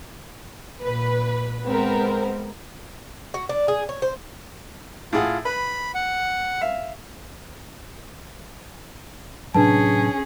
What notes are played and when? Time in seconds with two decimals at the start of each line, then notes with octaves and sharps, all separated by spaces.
0.83 A#2 B4
1.66 G#3 B3 C4 A#4
3.34 F#4
3.49 D4
3.68 G#4
3.89 C#5
4.02 C5
5.13 A2 F4 G#4 F#5
5.45 B4 B5
5.95 F#5
6.61 E5 F5
9.54 A2 C3 F#3 C#4 D4 G#4 B4 A5